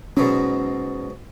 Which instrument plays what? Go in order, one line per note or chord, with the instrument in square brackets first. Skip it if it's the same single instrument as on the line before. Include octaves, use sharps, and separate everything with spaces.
[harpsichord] G#2 B2 F#3 [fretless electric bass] C#4